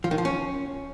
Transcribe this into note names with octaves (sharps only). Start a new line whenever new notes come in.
F3
D#3
F3
C#4